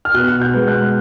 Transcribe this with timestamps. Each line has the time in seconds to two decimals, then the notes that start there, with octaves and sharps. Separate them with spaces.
0.05 F6
0.14 B2 F#6
0.42 G6
0.54 G#3 B3
0.68 F#6